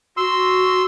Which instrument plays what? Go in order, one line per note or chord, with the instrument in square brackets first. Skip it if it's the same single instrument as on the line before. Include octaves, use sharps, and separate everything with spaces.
[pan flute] F#4 [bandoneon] C6 E6